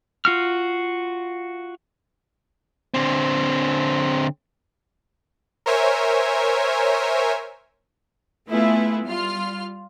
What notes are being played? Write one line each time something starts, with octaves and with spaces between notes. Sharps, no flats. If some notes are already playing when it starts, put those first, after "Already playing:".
F4 F#4 F6
D3 C4
A#4 C5 C#5 E5 G#5
A3 B3 E4 F4 G#4 B4
G3 F4 F6